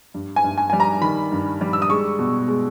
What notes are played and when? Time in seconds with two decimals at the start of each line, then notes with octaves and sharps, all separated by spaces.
0.14 G2
0.36 G#5
0.44 G2
0.58 G#5
0.70 G3 G#5
0.80 A#5
1.01 D#3 B5
1.32 G2
1.61 G3
1.73 E6
1.82 D#6
1.90 G#3 C#6
2.19 B2
2.48 G#3